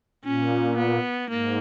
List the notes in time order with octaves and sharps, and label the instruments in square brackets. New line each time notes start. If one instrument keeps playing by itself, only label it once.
[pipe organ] A#2 [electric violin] C#4
[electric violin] B3
[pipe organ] G#2 [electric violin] A#3